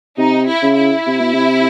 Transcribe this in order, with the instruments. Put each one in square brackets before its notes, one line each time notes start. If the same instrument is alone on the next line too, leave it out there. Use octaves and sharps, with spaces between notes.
[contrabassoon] C3 [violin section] D#4
[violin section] E4
[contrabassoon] C#3
[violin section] E4
[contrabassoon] C3
B2
C3